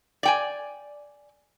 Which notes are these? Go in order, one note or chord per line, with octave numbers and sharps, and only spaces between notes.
D5 G5 G#5